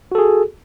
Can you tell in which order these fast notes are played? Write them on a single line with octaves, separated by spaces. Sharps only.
F#4 A4 G#4